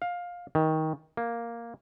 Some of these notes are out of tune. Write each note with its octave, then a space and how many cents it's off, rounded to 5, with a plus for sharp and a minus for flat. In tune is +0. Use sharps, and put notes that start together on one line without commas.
F5 +15
D#3 +20
A#3 +0